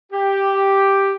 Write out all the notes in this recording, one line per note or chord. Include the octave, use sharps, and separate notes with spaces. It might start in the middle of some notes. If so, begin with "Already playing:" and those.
G4